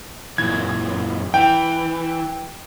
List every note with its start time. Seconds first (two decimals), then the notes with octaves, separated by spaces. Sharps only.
0.38 F#2 A#2 E3 G#6
1.34 E3 G5